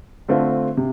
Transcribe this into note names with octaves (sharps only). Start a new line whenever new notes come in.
D3 A3 C4 F4
C3